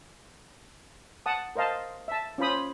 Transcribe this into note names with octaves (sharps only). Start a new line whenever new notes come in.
F#5 A5 D#6
A#4 C5 D#5 F5 A5
E5 A5
C#4 F4 C5 B5 D#6